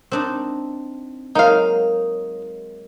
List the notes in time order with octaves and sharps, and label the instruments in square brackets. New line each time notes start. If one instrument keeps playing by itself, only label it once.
[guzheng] C4 D4 D#4
[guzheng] F#3 G#3 A#3 [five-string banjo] D#4 F5